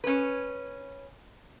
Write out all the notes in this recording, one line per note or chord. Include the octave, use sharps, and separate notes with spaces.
C#4 B4